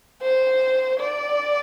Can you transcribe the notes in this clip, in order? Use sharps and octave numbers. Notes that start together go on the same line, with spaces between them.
C5
D5